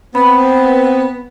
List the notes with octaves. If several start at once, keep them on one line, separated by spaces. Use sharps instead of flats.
B3 C4 B5